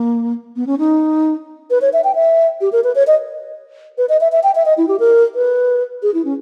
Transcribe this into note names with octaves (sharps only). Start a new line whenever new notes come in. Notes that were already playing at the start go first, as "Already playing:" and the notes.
Already playing: A#3
B3
C#4
D#4
B4
C#5
E5
G5
E5
G4
A#4
B4
C#5
D#5
B4
D#5
E5
E5
G5
E5
D#5
E4
G4
A#4
B4
G#4
E4
C#4